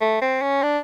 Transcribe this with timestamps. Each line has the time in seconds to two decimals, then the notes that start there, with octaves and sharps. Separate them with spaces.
0.01 A3
0.21 C4
0.42 C#4
0.62 D4